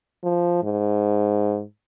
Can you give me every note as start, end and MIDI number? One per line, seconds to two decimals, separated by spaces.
0.23 0.58 53
0.63 1.63 44